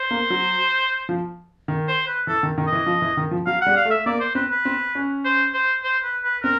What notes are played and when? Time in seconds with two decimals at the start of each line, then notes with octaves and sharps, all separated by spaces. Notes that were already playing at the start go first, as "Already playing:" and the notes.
Already playing: C5
0.11 A#3
0.30 F#3
1.09 F3
1.68 D#3
1.88 C5
2.07 B4
2.27 E3 A4
2.43 D#3
2.58 D#3
2.67 D#5
2.72 E3
2.86 F3
3.02 E3
3.17 D#3
3.31 F3
3.46 F#3 F5
3.61 F#5
3.66 G3
3.76 F5
3.85 A3
3.91 E5
4.06 A#3 D5
4.21 C5
4.35 C4 B4
4.51 B4
4.65 C4
4.95 C#4
5.25 C5
5.54 C5
5.84 C5
6.04 B4
6.24 B4
6.43 C4 A#4